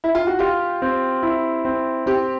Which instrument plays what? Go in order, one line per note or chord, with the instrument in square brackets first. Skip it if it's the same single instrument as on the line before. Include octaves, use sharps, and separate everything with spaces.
[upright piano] E4
F4
F#4
[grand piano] F4 [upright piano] G4
[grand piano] C4
E4
C4
[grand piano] C4 [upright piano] G4